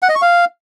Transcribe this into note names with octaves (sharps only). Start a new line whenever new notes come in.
F#5
D#5
C#6
F5